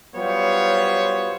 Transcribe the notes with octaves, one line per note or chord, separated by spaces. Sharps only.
F#3 G3 B3 F4 C5 C#5